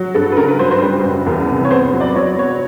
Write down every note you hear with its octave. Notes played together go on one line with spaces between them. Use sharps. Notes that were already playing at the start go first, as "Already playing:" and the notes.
Already playing: F#3
G2 A4
B4
C#3 A#4
B4
F#3 C5
C5
G3 B4
F#2
E2 A#4
C3 B4
C#5
B3 C5
F#3
D5
F#3 C#5
B3 C#5